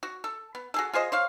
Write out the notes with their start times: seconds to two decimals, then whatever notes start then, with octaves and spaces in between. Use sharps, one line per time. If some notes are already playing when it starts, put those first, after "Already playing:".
0.03 F#4
0.24 A4
0.55 B3
0.74 F#4 G#4 A4
0.93 F4 G#4 C5 D#5
1.12 C5 C#5 F5